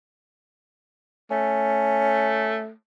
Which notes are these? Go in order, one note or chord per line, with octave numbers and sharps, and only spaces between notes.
A3 C#4